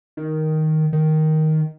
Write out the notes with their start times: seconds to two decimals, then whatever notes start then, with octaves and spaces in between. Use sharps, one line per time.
0.17 D#3
0.93 D#3